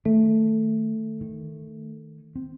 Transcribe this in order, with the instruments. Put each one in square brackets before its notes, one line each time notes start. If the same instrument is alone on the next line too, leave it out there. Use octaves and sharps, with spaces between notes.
[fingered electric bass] D#3 [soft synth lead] A3
[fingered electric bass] D#3
C4